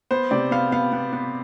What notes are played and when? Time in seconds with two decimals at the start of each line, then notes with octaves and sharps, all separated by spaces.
0.11 B3 C5
0.31 C3 D5
0.51 B3 F5
0.72 B3 F5
0.93 B3
1.13 B3